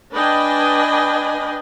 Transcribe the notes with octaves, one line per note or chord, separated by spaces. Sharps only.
D4 B4 D#5 G5 G#5